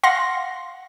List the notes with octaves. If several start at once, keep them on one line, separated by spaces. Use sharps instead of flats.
F5 F#5 C6 A#6